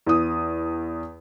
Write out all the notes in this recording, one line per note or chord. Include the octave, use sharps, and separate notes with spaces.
E2 D#6